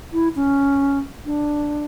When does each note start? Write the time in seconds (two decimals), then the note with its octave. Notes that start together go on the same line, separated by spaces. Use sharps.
0.13 E4
0.36 C#4
1.26 D4